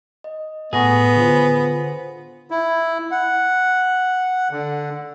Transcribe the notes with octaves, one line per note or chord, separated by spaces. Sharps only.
D#5
A2 B3 G#4 A4 F#5 C#6 A#6
D3 F4 C5
E4
F#5
D3